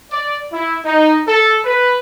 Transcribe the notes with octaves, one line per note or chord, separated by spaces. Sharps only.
D5
E4
D#4
A4
B4